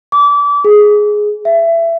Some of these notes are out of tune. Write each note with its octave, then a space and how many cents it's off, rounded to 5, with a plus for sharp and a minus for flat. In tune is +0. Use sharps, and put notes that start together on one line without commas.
D6 -30
G#4 +5
E5 +20